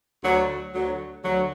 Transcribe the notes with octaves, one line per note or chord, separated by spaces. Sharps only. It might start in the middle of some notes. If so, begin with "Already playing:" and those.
D2 D3 F#3
D2 D3 F#3
D2 D3 F#3